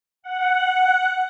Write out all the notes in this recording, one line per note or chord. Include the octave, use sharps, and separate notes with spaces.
F#5